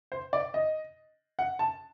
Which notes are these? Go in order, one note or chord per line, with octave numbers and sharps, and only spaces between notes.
C5
D5
D#5
F#5
A5